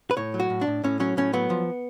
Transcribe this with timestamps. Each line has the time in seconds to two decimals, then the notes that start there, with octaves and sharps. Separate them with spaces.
0.11 B4
0.17 A2 C#5
0.34 F#3
0.40 F#4
0.50 A2
0.61 D4
0.67 A2
0.84 A2 C#4
1.00 F#3 C#4
1.17 A2 C#4
1.33 F#3 B3
1.50 F3